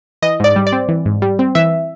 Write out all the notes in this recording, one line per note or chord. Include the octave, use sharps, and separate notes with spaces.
E3 D#5
G#2 D5
G3
D5
C4
E3
G#2
G3
C4
E3 E5